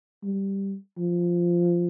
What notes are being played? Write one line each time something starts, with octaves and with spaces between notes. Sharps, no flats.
G3
F3